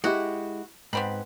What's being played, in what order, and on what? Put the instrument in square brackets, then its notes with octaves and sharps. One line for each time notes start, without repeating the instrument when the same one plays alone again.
[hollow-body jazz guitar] G#3 E4 G4 [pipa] F#4
[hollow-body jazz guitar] G#2 [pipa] B3 C4 B5